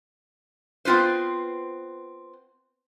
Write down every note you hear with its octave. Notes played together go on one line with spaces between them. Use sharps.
B3 C4 F4 B4 C5